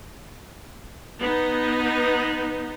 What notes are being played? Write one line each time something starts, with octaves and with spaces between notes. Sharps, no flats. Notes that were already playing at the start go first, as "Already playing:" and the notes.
B3 D#4